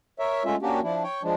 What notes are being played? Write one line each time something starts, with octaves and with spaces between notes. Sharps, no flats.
A#4 C#5 E5
G#3 A3 C#4 F4 E5
A#3 C#4 D4 F#4 G4
F3 D4 E4
C#5 G5
F3 G#3 D4